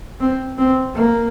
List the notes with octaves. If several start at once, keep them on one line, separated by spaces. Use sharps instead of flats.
C4
C4
A#3